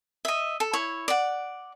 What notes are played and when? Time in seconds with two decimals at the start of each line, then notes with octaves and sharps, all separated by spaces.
0.25 D#5 E5
0.60 A4
0.73 E4 C#5
1.08 D5 F#5